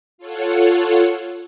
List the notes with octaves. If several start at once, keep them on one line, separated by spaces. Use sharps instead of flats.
F4 A4 C#5 F#5